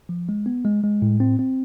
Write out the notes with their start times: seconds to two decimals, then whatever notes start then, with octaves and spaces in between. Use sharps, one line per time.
0.09 F3
0.29 G#3
0.46 B3
0.65 G#3
0.84 G#3
1.02 A2
1.20 C4
1.39 C4